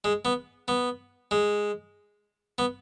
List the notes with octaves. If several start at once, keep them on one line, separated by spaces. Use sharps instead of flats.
G#3
B3
B3
G#3
B3